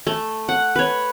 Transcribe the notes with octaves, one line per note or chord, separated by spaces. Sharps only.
A3
F#5
B4 C#5